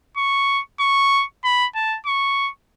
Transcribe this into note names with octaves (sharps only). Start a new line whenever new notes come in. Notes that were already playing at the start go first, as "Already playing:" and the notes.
C#6
C#6
B5
A5
C#6